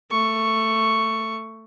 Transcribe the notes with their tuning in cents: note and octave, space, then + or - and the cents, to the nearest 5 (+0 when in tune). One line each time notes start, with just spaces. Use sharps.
A3 +15 C#6 +0